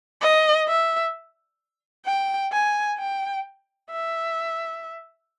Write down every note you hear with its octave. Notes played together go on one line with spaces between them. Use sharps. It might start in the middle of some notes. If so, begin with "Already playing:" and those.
D#5
E5
G5
G#5
G5
E5